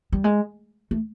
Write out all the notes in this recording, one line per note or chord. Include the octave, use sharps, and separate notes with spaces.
G3
G#3
A3